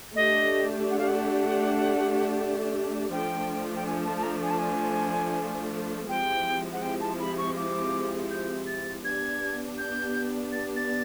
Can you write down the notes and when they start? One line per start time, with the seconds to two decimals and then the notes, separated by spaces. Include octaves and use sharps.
0.15 A3 D4 G4 D#5
0.90 F#5
0.98 F5
1.07 F#5
3.11 F3 A3 D4 G5
3.75 G5
3.86 G#5
4.04 A5
4.16 A5
4.22 A#5
4.42 G#5
4.50 A5
4.58 G#5
6.07 F3 G#3 C4 E4 G4 G5
6.72 F#5
6.81 G5
7.00 A5
7.19 B5
7.37 C#6
7.56 D6
8.30 G6
8.66 A6
9.04 B3 D4 G4 G#6
9.77 G6
10.52 A6
10.76 A6